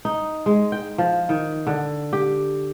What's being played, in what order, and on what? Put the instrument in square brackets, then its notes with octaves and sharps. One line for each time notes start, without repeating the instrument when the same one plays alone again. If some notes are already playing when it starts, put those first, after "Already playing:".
[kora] D#4
G#3
G5
F3
D#3
D3
G4